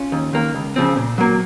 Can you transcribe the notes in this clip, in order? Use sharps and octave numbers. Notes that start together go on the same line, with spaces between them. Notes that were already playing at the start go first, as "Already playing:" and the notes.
Already playing: C#4 F4
D#2
D#3 A#3
C#2
C#3 F3 C4
A#2
F#3 A#3